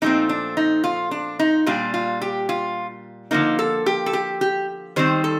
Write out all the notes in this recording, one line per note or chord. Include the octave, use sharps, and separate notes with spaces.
A#2 F3 A3 C4 D#4
D4
D#4
F4
D4
D#4
A#2 G3 D4 F4
F4
G4
F4
D3 F3 A#3 D#4
A4
G4
A4
G4
G4
D#3 G3 C4 C5
A4